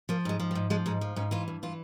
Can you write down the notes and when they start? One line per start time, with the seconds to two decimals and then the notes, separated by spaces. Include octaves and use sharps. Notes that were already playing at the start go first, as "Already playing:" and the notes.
0.09 F3 A#3
0.25 G#2 G#3
0.40 F3
0.51 G3
0.55 G#2
0.70 F3 G#3
0.86 G#2 G#3
1.01 F3
1.16 G#2 C#4
1.31 E3 F4
1.48 G2
1.63 E3 F4